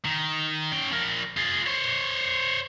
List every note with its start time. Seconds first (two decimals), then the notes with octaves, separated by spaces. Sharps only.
0.05 D#3
0.72 C#4 G5
0.92 F3 A#4
1.37 F4 G#4
1.67 C5 C#5